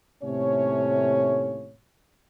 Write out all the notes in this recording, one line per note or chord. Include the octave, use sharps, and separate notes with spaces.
D#2 A2 C3 A3 C#4 C#5